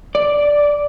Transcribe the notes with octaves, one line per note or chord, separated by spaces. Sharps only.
D5